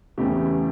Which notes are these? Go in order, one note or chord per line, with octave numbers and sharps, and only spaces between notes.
E2 C#3 E3 A3 G4